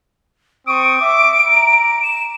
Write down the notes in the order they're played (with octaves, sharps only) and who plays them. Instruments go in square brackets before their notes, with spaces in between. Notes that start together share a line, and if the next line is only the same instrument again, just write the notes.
[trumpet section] C4 C#6 D#6 [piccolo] D7
[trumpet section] E5 D6
A#5
[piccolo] E7